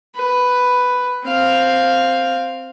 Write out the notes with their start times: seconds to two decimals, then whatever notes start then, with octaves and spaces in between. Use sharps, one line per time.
0.16 B4
1.26 C4 F5